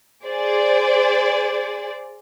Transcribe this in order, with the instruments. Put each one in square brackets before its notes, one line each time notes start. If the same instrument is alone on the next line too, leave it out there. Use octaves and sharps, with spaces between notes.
[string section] G#4 C5 D5